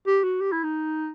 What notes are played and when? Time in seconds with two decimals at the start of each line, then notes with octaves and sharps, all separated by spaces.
0.07 G4
0.24 F#4
0.41 G4
0.52 E4
0.64 D#4